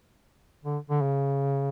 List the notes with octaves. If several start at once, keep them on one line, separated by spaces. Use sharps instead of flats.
D3
D3
C#3